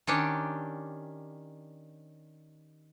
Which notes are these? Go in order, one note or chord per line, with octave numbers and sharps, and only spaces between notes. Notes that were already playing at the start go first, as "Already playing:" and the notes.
D#3 C#4 D4 G4